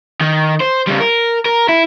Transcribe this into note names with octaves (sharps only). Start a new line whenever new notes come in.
D#3
C5
C#3 G3
A#4
A#4
E4